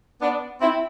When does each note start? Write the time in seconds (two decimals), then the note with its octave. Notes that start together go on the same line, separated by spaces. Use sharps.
0.22 B3 D4
0.61 C4 E4